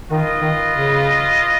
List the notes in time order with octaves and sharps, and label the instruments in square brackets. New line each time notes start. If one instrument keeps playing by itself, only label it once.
[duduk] D#3 [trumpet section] F4 B4 D#5
[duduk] D#3
C#3